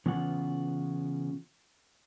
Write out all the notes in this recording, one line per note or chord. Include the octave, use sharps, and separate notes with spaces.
C#3 E3 B3 F4 F#5